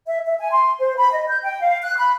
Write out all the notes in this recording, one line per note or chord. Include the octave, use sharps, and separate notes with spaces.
E5
E5
G#5
C6
C5
B5
D#5
G6
G5
F5
F#6
B5